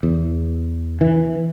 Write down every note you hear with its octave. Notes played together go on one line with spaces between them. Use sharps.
E2
E3